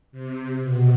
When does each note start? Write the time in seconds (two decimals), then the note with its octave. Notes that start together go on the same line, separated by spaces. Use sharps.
0.12 C3
0.61 B2